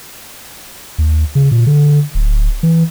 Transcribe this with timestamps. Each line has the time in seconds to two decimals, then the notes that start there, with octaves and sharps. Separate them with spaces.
0.98 D#2
1.35 C#3
1.52 A#2
1.66 D3
2.15 D1
2.63 E3